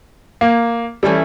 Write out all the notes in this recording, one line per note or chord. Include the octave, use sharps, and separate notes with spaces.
A#3
E3 G3 A3 C#4 E4 A4